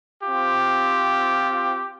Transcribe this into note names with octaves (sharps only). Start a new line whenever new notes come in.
C4 F4 G4